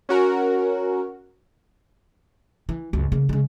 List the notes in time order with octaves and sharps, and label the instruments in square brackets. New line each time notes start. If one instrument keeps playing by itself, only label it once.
[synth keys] C#4 F#4 A#4
[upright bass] E3
C#2 F#2
C#3 A#3
C#3 G#3